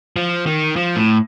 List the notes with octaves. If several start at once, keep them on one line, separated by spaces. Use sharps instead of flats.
F3
D#3
F3
A2